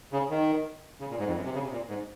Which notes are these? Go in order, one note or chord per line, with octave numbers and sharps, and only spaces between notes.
C#3
D#3
C#3
A#2
G#2
F2
F#2
C3
C#3
C3
A#2
G#2